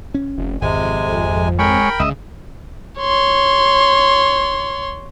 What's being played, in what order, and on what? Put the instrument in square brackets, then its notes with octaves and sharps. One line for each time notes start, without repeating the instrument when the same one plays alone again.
[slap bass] C#4
[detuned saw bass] F1
[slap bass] G#1 [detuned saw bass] F2 [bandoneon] C3 G#3 G#5
[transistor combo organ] G#3 C#5 [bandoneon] A#4 G5 B5
[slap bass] C#2 [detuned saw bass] C#3 [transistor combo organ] D#5 E5
[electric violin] C#5 C6